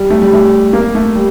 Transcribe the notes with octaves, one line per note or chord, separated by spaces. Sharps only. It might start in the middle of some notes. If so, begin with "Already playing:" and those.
Already playing: G3
A3
G3
A3
A#3
A3
G3